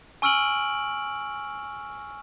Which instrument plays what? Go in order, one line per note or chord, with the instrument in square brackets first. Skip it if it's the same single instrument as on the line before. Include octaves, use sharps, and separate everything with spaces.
[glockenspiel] G#5 C#6 E6 F6 D7 F#7